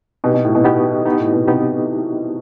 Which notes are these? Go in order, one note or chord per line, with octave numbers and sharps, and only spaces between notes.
B2 B3 D#4 G4
B2
A2
B2
B3 D#4 G4
B3 D#4 G4
A2
B2
C3 B3 D#4 G4